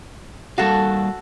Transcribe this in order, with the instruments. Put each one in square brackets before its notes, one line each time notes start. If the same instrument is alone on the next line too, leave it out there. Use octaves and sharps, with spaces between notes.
[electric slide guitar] G3 A#3 F5 [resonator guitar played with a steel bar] F#4 A4